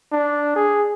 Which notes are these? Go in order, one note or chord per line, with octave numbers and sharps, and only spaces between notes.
D4
G#4